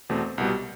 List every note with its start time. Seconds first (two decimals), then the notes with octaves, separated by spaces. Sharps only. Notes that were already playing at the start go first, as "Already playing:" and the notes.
0.09 E2 B2 A3 C4
0.38 C2 B2 G3